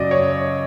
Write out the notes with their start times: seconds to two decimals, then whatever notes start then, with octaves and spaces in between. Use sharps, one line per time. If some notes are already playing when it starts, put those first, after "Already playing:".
Already playing: F#2 C#3 F#3 D5 D#5
0.11 C#5